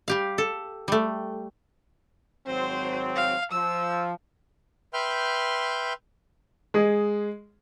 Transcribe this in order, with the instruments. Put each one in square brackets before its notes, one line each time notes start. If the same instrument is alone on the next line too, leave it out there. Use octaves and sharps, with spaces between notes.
[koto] G3 G4 F5
A4
G3 A3
[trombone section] G#1 F#3 C4 [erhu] C5
[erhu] F5
[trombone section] F3 [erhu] E6
[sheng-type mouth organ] B4 E5 G5 C6 F6 G6
[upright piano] G#3 G#4